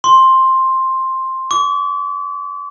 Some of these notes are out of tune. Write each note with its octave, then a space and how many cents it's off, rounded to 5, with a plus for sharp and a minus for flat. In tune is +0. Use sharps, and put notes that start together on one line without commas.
C6 +10
D6 -45